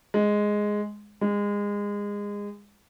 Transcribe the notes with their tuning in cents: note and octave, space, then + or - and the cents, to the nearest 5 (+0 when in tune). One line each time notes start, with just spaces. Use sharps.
G#3 +0
G#3 -25